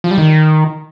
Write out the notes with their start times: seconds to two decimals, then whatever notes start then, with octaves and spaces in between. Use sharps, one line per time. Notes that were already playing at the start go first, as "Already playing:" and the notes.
0.04 F3
0.11 G3
0.18 D#3